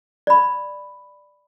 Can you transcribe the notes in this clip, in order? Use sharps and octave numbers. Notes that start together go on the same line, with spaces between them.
D5 B5